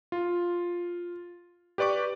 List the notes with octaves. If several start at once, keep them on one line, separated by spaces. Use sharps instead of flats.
F4
G4 B4 D5 C#6 D6